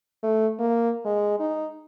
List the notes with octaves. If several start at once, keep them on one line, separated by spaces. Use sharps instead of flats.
A3
A#3
G#3
D#4